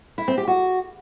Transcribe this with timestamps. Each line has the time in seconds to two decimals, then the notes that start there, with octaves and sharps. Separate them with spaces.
0.18 E4
0.28 C4
0.38 G4
0.48 F#4